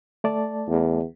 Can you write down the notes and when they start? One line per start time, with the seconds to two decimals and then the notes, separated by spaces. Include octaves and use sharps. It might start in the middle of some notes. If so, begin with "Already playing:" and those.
0.24 A3 D5 A5
0.68 E2